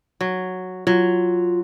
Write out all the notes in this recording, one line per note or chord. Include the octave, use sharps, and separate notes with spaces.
F#3
F#3 F4